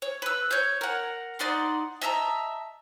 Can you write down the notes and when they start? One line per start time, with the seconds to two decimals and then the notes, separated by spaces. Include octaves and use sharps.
0.02 C#5
0.22 B4 E6
0.51 C#5 G6
0.81 A#4 F#5
1.39 D#4 D5 F#5 C6
2.02 D#5 E5 A5 A#5